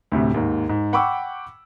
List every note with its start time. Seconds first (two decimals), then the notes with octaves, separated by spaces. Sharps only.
0.12 D2 A2 C3
0.34 D#2 G#2
0.69 G#2
0.93 F#5 G5 B5 C#6 D6 E6